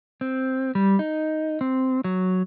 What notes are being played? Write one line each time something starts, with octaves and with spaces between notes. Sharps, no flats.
C4
G3
D#4
C4
F#3